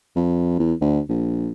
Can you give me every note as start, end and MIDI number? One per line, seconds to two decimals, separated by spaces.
0.16 0.58 41
0.59 0.74 40
0.81 1.00 38
1.09 1.52 34